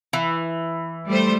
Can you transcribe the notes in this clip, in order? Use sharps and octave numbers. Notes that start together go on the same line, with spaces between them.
E3
G3 A3 C5